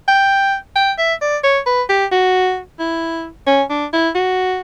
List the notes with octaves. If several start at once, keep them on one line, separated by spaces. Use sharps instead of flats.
G5
G5
E5
D5
C#5
B4
G4
F#4
E4
C#4
D4
E4
F#4